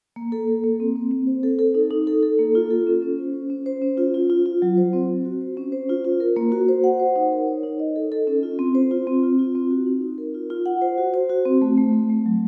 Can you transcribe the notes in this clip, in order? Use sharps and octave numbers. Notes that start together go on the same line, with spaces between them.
A#3
A4
A#3
A#3
C4
C4
C4
C5
A4
A4
D#4
D#4
A4
A4
A#3
F4
A4
C#4
C#4
C5
C#4
C#4
C5
C#4
F4
F4
F4
F4
F#3
C5
C4
C4
F#4
C5
C#4
C5
F4
F4
A#4
A#3
F#4
C5
F#5
C5
D#4
A#4
C#5
D#4
D#5
A4
A4
C#4
F4
C4
C5
F4
C4
F4
F4
C4
F#4
D#4
D#4
A#4
F4
F4
F#5
C5
F#4
C5
F#4
C4
A3
A3
A3
A3
F#3